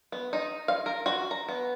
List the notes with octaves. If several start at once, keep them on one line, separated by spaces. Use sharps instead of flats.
B3
D#4
F5
A#4
F#4
A#5
B3